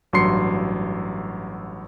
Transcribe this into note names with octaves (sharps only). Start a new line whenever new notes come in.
A1 G2 F#3 C6 C7 C#7